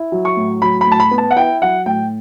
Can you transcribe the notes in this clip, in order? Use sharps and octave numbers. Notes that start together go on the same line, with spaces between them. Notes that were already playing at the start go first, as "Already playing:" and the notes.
Already playing: E4
F#3
C#6
A2
F#3 B5
B5
A2 A5
B5
B3
A5
F#5
E4 G5
F#3 F#5
A2 G5